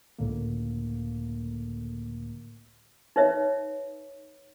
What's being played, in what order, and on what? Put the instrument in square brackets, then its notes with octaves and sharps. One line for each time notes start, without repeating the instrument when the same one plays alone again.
[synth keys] C#2 A2 D3 A#3
[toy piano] D#4 B4 C#5 E5